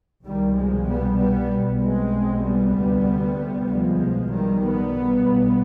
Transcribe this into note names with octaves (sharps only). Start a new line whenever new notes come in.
C2 B2 D#3 G3
F3 G#3
G3 B3
G3 B3
B1 B2
G#3 C4
G3 B3
D2 C3
F3 G#3
B1 B2
D#3 G3
G3 B3
B1 B2